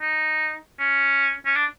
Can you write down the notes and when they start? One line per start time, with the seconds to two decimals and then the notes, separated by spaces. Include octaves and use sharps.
0.01 D#4
0.79 C#4
1.45 C#4
1.56 D4